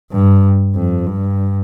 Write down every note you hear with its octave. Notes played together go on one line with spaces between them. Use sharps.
G2
F2
G2